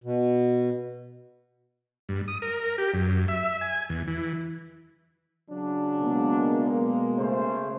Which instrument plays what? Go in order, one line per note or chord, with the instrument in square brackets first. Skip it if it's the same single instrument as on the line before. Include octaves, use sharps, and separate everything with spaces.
[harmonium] B2
[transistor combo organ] G2
D#6
A#4
G4
F#2
E5
G#5
E2
E3
[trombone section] C#3 F#3 D4
[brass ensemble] B2 G#3 A#3
[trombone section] C#3 A3 C5